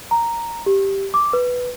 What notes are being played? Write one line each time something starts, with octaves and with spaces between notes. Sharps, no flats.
A#5
G4
D6
B4